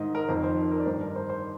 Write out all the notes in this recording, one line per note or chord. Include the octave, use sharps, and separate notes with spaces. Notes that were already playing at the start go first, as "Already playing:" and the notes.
Already playing: G#2 D#3 D#5
A#4
F2 D#3 C5
C5
A#4
D5
G2 D#3 C5
A#4
C5
C5